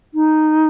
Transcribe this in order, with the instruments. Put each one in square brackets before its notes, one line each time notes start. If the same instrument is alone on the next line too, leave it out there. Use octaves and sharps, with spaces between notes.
[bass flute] D#4